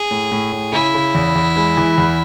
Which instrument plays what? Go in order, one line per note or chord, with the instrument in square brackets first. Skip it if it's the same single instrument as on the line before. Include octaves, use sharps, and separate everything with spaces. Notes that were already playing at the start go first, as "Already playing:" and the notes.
Already playing: [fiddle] G#4
[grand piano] A2
A2
A2
[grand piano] C#3 [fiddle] E4
[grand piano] C#3
E2
E2
G#3
E3
E2